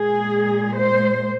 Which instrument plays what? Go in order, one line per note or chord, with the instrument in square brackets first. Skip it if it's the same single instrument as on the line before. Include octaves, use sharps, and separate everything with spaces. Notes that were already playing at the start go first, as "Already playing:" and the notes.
Already playing: [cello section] A#2 G#3 G#4
C5